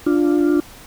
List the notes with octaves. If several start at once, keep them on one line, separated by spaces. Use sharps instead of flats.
D4 F4